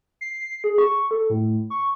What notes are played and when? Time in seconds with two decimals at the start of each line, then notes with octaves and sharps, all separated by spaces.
0.21 C7
0.64 G#4
0.78 C#6
1.11 A4
1.30 A2
1.70 C#6